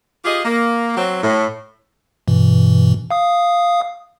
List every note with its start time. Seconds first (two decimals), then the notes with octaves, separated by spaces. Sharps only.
0.25 F4 G4 G#4 D#5
0.44 A#3
0.97 F#3 C4
1.23 A2
2.28 G2 B2 E3
3.11 F5 D#6